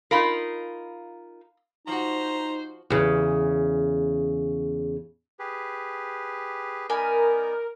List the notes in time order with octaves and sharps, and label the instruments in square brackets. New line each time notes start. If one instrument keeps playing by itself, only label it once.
[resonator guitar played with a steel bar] D#4 F4 A#4 [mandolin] F5 B5 C6
[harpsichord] F3 F#4 [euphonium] D#4 [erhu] C5 [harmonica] A#5
[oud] E2 C#3
[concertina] G4 G#4 B4
[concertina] B3 D#4 D5 [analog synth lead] A#4 [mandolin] G#5 B5